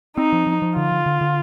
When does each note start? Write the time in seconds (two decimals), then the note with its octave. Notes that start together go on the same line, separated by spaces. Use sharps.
0.17 C4 D#4
0.32 F3
0.47 F3
0.62 F3
0.76 D3 F4
0.92 D3
1.06 D3
1.21 D3